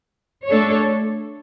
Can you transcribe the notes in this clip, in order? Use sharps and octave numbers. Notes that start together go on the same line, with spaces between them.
A3 D4 A4 C#5